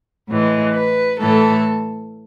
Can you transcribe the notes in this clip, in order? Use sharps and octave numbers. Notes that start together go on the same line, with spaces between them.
A2 E3 G#3
B4
A2 E3 A3 A4